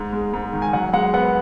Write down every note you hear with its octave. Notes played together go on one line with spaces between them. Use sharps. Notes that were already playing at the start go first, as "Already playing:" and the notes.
Already playing: G#2 G#3
G#3
G#2
D#3
G#5
F#2 F#5
G#3 F#5
B3 F#5